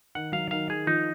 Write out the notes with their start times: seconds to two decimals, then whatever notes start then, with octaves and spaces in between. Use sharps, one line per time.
0.15 D#3 F#5
0.33 F#3 F5
0.51 D#3 F5
0.69 D#3 G#4
0.87 F3 D#4